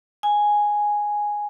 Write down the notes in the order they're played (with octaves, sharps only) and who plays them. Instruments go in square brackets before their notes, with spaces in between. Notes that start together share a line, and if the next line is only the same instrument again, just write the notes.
[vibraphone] G#5